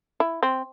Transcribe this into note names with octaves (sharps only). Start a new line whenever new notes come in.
E4
C4